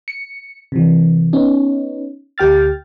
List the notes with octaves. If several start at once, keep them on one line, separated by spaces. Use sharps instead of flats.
C#7
C3 E3
B3 C#4 D#4
D2 G4 G5 F6 A6